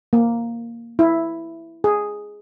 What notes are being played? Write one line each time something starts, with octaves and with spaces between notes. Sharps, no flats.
A#3
E4
G#4